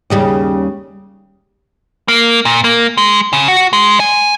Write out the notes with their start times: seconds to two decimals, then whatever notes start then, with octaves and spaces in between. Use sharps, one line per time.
0.10 D#2 C#3 G3
2.08 A#3
2.45 A#2
2.64 A#3
2.98 G#3
3.33 C#3
3.48 F#4
3.73 G#3
4.00 G#5